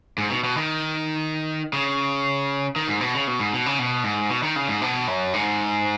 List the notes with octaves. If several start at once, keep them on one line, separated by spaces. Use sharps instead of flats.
G#2
B2
B2
D#3
C#3
D#3
G#2
B2
C#3
B2
G#2
B2
C#3
B2
G#2
B2
D#3
C#3
G#2
B2
F#2
G#2